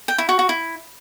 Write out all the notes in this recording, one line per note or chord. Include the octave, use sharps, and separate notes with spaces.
G5
E4
F#4
F#4
E4